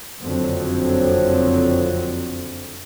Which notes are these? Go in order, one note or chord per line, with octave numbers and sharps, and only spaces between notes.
F#1 F2 D3 F3 F#3 C4